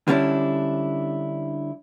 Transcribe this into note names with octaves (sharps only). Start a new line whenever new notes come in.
D3 G3 C#4 D4 E4